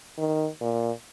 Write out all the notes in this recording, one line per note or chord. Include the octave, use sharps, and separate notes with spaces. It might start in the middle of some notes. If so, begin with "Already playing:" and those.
D#3
A#2